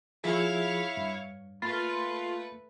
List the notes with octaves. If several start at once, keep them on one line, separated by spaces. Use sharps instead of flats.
F3 E4 F4 G#4 C#5 F5
G2
A3 A#3 F4 B4 B5 A6